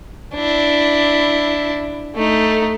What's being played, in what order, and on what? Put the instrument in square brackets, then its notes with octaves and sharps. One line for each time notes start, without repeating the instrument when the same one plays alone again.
[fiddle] D4 E4
A3 D#4